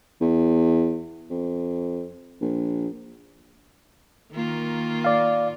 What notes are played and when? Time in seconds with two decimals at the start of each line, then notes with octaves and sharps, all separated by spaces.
0.21 E2
1.30 F2
2.41 A#1
4.33 D#3 A#3 F4
5.04 D5 F5